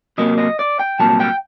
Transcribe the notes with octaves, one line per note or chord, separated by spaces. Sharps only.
C3 F#3 A#3 D#5
D#5
D5
G5
C2 A#2 F#3 A5
G5